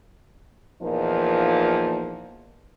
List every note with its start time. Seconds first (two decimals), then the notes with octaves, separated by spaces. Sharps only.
0.82 E2 A#2 F3 A#3 D#4